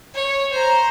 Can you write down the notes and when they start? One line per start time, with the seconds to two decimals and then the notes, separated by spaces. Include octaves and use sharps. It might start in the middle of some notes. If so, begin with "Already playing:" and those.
0.14 C#5
0.53 C5 A#5